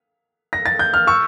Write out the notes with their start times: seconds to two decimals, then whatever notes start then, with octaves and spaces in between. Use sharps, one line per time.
0.53 A#6
0.66 A6
0.79 G6
0.94 F6
1.07 C#6 E6